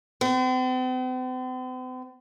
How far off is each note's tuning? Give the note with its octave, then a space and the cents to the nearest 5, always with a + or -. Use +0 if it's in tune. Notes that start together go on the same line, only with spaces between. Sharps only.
C4 -45